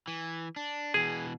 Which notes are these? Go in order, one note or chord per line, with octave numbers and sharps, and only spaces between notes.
E3
D4
B2 E3 G#4